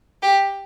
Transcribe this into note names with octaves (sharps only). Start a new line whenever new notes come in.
G4